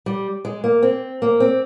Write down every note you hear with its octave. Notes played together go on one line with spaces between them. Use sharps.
G3
G#3
A#3
C4
A#3
C4